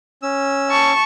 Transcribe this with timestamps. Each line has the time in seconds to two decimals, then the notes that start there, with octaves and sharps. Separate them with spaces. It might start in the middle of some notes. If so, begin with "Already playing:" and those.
0.22 C#4 E6
0.70 A5 C#6